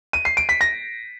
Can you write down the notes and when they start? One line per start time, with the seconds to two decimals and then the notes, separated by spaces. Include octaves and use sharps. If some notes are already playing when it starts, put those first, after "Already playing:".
0.13 D#7
0.25 C7
0.37 D7
0.49 B6
0.61 A#6